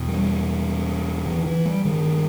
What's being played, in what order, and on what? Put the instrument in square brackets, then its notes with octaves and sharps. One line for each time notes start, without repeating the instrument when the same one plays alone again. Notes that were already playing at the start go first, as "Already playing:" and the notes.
Already playing: [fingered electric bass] E2 B2
G3
E3
E3
G3
G2 D#3